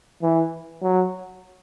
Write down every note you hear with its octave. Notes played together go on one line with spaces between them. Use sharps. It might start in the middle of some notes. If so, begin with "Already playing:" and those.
E3
F#3